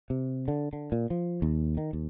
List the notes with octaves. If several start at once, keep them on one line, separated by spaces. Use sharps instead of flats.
C3
D3
D3
A#2
F3
D#2
D#3
D#2